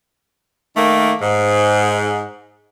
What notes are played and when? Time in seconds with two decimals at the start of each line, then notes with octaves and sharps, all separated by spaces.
0.76 D#3 A3 A#3
1.21 G#2